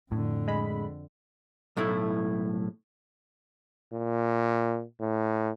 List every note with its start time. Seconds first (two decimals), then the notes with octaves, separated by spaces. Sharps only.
0.12 F2 A2 D3
0.47 G#3 B5
1.77 B1 A2 A3 E4
3.94 A#2
5.00 A2